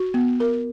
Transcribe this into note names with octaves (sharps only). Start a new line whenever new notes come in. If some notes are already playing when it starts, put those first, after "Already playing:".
Already playing: F#4
B3
A#4